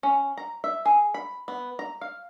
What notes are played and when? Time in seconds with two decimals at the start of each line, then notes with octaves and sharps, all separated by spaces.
0.03 C#4
0.38 A#5
0.64 E5
0.85 G#4
1.14 B5
1.48 B3
1.79 A#5
2.01 F5